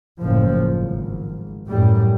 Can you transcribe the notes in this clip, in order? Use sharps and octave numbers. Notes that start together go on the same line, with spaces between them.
F#1 A2 F3
G#1
F#2 A2 G3